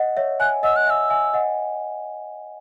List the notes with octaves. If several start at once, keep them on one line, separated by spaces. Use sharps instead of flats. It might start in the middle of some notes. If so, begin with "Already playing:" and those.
Already playing: D#5 F#5
C#5 E5
E5 G#5 F#6
D#5 F#5 E6
F#6
E5 G#5
E6
E5 G#5
D#5 F#5